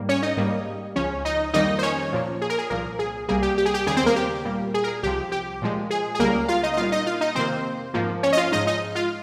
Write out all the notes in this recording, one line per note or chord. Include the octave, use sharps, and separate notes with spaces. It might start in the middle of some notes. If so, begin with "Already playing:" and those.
Already playing: G#2 G3 A#3
C#4 C#5
D#4 D#5
G#2 G3 A#3
C#2 C#3 F3 C#4 C#5
D#4 D#5
F2 D#3 G3 A#3 D#4 D#5
C5
C#4 C#5
A#2 F3 A#3
G#4
A#4
G#4
C2 A#2 F3 A#3 A#4
G#4
C2 C3 G3 A#3 G#4
G4
G4
G#4
G4
D#2 C#3 G3 G#4
C4 C5
A#3 A#4
G4
A#2 G3 A#3
G#4
A#4
G#4
C2 C3 F3 G4
G4
A#2 F3 G#3
G#4
G#4
C#2 C#3 G3 A#3 A#4
F4 F5
D#4 D#5
D#5
A#2 G3 A#3 F4 F5
D#4 D#5
F4 F5
D#4 D#5
F2 C3 D#3 A#3 C4 C5
G#2 F3 A#3
C#4 C#5
D#5
F4 F5
G#2 F3 G#3 D#4 D#5
D#4 D#5
F4 F5